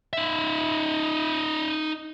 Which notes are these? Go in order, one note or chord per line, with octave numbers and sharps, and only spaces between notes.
D#4 E5